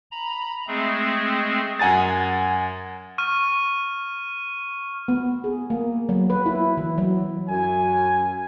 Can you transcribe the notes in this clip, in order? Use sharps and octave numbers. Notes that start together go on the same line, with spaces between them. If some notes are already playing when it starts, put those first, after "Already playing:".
A#5 B5
G#3 A3 C4 G#4
F#2 F#5 G#5 A#5 A6
C#6 F6 D#7
B3
G#4
A#3
F#3
B4
E4
E3
F#3
F#2 G#5